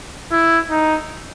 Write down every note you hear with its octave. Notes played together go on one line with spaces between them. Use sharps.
E4
D#4